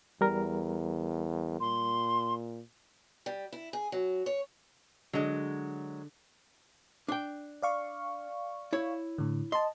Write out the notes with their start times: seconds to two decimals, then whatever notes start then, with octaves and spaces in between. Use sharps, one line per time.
0.21 E2 G3 A#4
1.61 A#2 C6
3.26 G3
3.53 E4
3.73 G#4
3.92 F#3
4.26 C#5
5.13 D3 F#3 G#3
7.08 D4 G5
7.62 D5 F5 C#6
8.73 E4 C#5
9.18 A2 D3
9.52 D#5 A5 C6